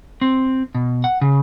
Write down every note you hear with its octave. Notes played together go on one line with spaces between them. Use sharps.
C4
B2
F#5
C#3